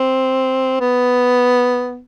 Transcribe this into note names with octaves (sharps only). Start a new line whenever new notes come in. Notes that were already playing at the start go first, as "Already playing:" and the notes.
Already playing: C4
B3